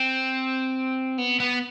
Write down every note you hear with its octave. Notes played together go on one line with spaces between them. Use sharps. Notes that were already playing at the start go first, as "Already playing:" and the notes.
Already playing: C4
B3
B3